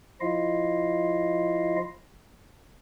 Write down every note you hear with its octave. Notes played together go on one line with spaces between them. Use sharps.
F3 E4 F4 D#5 F5